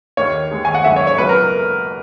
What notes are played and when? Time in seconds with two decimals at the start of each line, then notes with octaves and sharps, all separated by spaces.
0.17 D#2 D#3 A#3 C#5
0.51 D#2 D#3 G#3
0.65 G#5
0.75 F#5
0.84 G#1 F#2 C#3 E5
0.96 C#5
1.07 C#5
1.18 C#2 B2 F#3 A#3 B4
1.29 A#4